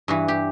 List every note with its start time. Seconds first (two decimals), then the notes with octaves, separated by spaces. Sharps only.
0.08 G2 E3 F#4
0.28 G4